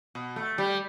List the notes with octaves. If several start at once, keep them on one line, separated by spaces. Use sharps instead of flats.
B2
A3
G3